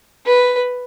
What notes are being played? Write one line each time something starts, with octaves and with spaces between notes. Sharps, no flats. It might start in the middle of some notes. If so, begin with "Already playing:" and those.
B4